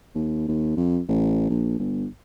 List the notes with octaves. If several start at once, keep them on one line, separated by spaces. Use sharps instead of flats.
D#2
D#2
F2
A1
A#1
G1